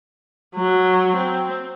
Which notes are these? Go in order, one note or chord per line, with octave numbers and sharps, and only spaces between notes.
F#3
C4